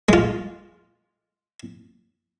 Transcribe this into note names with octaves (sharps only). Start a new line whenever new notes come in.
G#3 F4